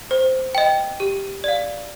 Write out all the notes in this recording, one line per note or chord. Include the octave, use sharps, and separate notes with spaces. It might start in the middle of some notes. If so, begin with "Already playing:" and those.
C5
D#5 G5
G4
D5 F5